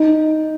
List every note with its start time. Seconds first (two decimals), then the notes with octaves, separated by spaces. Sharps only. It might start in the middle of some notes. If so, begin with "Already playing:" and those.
Already playing: D#4